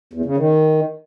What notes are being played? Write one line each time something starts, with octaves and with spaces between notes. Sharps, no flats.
E2
C#3
D#3